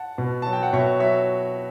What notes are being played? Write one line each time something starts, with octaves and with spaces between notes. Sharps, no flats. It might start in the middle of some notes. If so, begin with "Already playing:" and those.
Already playing: F#5 A5
B2
F#3 A5
G5
F#5
B2 C#5 E5
F#3 C#5 E5